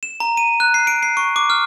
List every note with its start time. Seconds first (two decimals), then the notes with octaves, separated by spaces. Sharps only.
0.03 E7
0.20 A#5
0.37 D#7
0.60 F#6
0.74 C7
0.87 D7
1.03 C7
1.17 C#6
1.36 D6
1.50 F6